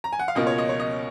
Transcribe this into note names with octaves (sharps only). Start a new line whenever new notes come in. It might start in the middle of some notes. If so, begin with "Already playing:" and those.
A#5
G#5
F#5
F5
C#2 B2 A#3 F4 D#5
C#5
D#5
C#5
D#5